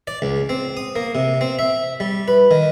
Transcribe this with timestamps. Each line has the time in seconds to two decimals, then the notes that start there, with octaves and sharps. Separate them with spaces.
0.07 D5
0.22 C#2
0.49 C4
0.77 D#6
0.96 A#3
1.15 C3
1.41 C4
1.59 E5
2.00 G3
2.28 B4
2.51 D#3